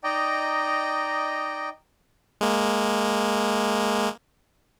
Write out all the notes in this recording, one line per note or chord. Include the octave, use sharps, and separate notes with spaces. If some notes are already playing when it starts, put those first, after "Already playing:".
D#4 D5 D#5 G5 A#5
G#3 A#3